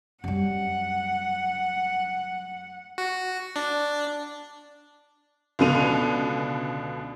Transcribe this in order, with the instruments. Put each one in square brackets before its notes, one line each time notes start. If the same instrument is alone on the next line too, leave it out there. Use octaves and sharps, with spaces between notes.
[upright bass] F#2 G3 [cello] F#5
[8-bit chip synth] F#4
D4
[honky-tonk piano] C#2 B2 D3 D#7 F7